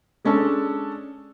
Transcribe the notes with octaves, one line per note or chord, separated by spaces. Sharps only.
G#3 C#4 D4 A4